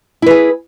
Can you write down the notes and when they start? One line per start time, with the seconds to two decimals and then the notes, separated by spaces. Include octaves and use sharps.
0.22 E4
0.26 B4
0.31 G#4